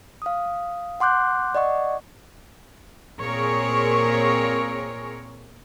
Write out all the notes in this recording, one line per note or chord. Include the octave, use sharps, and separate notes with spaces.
F5 D#6
F#5 C6 D6 F#6 G6
D5 D#5 F#5 C#6
A#2 C4 G#4 A#4 C#5